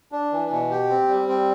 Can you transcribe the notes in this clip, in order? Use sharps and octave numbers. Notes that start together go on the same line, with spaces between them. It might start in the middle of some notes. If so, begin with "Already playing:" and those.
D4
E3
B2
G4
C4
G3
C4